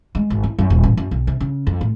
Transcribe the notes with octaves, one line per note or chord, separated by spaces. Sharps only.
G#3
G#1
E4
F#2
D#1
A1
F#2
B1
C3
C#3
F2
A2